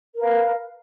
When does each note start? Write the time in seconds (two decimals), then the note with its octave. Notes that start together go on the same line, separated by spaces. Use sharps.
0.14 A#4
0.18 B4
0.21 F5